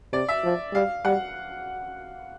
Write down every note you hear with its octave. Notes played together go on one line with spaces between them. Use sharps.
C3 D5
E5
F3
G3 F5
G3 F#5